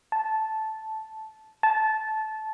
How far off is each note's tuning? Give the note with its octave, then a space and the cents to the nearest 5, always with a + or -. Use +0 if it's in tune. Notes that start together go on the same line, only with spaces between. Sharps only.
A5 -10
A5 -15